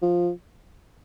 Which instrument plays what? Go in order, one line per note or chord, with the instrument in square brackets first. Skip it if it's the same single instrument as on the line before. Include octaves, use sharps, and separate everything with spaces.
[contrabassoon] F3